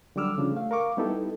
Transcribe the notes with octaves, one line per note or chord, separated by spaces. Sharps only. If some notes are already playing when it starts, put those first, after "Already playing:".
D3 F#3 G3 D6 E6 F6
C#3 F3 G3 D4
A3 F5
A#4 F5 C#6 D6
G3 B3 D#4 E4 G4 A4